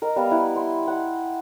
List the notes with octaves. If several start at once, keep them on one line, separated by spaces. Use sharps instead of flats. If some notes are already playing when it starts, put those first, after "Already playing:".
A#4 D#5
G3 B3 F5
E4 B4
C6
F#5